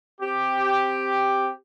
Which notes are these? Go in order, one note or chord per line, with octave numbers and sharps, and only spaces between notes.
C4 G4